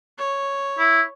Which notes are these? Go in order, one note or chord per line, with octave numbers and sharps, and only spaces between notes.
C#5
E4